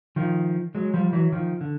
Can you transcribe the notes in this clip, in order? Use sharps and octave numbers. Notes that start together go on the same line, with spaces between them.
D#3 F3
F#3 G#3
F3 G3
E3 F#3
D#3 F3
D3